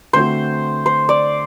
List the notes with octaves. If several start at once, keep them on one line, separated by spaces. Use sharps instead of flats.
D3 A3 C4 F#4 C5
C5
D5